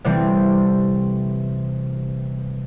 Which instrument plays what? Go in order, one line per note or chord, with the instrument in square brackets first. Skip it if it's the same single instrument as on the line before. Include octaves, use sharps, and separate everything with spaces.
[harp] C3 E3 G3 A3 C4